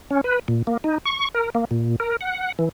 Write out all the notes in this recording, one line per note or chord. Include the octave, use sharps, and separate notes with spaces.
C#4
B4
A#2
A#3
D#4
C#6
A#4
A#3
A#2
A#4
F#5
E3